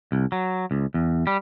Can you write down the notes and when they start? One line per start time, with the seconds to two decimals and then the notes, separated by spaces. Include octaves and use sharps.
0.12 C2
0.32 F#3
0.71 C#2
0.94 E2
1.27 G3